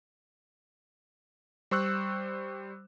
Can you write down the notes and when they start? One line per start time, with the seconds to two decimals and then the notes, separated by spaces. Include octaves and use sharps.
1.71 G3 C5 C#6 E6 F#6